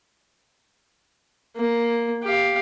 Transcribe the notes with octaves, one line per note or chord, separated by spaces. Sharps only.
A#3
G4 F5